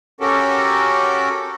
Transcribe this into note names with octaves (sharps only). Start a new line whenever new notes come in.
C#4 F#4 G4 A4 A#4